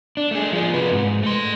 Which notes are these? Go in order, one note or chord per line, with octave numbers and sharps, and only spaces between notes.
D4
A3 G#4
F3 G#4
C3 B4
G#2
A3 C6